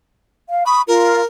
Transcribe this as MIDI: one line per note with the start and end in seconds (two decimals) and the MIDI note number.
0.50 0.62 77
0.66 0.82 83
0.66 0.79 85
0.66 0.79 87
0.87 1.20 65
0.87 1.25 70